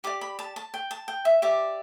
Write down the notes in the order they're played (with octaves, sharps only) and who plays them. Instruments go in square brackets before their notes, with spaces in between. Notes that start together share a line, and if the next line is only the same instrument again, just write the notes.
[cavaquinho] G4 D5 D6
B5
A5
A5
G5
A5
G5
E5
G4 D5 E5